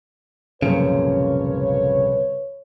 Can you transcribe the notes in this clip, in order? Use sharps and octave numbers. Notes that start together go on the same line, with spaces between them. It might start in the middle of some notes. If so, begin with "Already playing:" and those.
C2 F#2 A#2 C#3 F3 B4 C#5